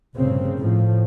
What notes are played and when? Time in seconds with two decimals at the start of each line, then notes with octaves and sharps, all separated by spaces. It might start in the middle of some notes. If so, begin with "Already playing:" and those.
0.16 F1 G2 A#2 C#3 C4
0.59 A2 F3